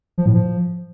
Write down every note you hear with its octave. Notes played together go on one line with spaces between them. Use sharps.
F3
A2
F3